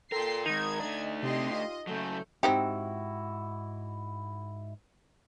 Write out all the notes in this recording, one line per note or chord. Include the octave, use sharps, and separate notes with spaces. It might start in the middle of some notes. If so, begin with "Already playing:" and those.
F4 A4 A#4 G5 C6 C7
D#3 G#3 D#4 A#4 G#6
A3 D4 D#5
C3 G4 D#5 C6
F4 D#5
C#3 F#3 A3 G6
G#2 C4 D#4 E4 F#4 G4 G5